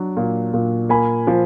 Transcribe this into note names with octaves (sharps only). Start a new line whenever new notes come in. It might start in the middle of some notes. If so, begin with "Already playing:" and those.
Already playing: F#3 D4
A#2
A#2
A#3 G#5 B5
F3